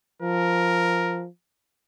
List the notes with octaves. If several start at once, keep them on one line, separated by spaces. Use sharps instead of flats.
F3 A#4